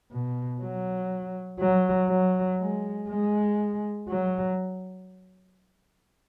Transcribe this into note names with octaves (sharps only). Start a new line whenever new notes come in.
B2
F#3
F#3
F#3
G#3
G#3
F#3